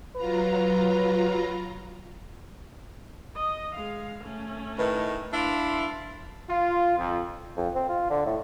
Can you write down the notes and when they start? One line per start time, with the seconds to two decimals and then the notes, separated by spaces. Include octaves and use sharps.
0.16 F#3 F4 B4 A#5
3.35 D#5
3.75 G#3 F5
4.24 A3 C#4
4.79 A2 D#3 B4
5.33 D4 E4 F5 C6
6.49 F4
6.98 F2
7.57 F2
7.75 C4
7.89 F4
8.10 D3
8.26 A2